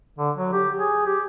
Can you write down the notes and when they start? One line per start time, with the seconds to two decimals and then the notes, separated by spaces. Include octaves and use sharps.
0.19 D3
0.36 F#3
0.53 G4
0.78 G#4
1.06 G4